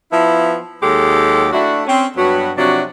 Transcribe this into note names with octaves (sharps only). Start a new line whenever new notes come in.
F3 B3 E4
D#2 F#3 G#3 G4 A4
A3 D4 E4 F#4
C4 C#4
G2 F#3 B3 F#4
C3 F3 F#3 D4 F#4